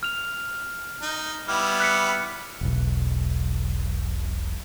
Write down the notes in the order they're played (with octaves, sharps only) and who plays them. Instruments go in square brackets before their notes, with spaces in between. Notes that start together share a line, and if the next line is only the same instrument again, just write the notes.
[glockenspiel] F6 F7
[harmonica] D#4
[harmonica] G3 B3 E4 [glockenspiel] F6
[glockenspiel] F#6 B6 C#7
[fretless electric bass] E1 B1